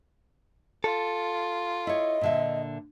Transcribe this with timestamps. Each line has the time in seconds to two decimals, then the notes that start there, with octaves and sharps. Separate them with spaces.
0.84 F4 A4
1.87 E4 C#5 D#5
2.21 A#2 D3 E5